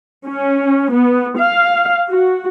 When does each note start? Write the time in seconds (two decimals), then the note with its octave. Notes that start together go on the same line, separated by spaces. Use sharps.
0.25 C#4
0.93 B3
1.38 F5
2.08 F#4